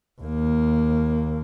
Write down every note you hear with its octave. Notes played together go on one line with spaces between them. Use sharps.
D#2 A#3